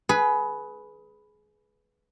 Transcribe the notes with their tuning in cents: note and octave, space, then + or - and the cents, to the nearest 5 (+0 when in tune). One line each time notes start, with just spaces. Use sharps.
G#4 +25 B4 +0